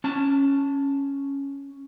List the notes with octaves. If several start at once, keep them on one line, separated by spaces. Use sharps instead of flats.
C#4 A5